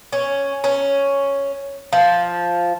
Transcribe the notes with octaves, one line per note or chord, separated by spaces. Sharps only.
C#4
C#4
F3